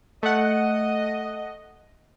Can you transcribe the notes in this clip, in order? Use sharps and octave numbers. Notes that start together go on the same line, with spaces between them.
A3 D#5 F#5